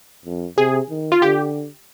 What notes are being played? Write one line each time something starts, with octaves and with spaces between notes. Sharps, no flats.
F2
C3 G#4
D#3
F4
D3 G4